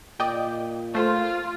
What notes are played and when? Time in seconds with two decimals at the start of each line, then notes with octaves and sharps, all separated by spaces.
0.20 A#2 D5 D#5 G5
0.95 A3 F4 C5